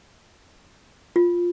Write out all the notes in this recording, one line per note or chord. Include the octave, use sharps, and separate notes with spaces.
F4